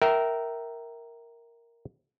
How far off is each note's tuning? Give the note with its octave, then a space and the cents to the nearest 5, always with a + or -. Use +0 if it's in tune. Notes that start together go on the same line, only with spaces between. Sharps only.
A#4 +0 E5 -10 G5 -25